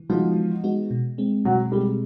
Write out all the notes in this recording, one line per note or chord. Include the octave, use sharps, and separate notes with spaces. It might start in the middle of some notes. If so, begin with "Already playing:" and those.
Already playing: E3
F3 G#3 B3 D#4 F#4
E3
G#3 B3 D#4 F#4
B2
G#3 C4
B2 F#3
G3 G#3 C4